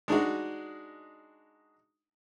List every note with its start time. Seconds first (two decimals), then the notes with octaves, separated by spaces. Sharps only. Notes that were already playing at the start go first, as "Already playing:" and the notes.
0.08 G#3 D4 D#4 F#4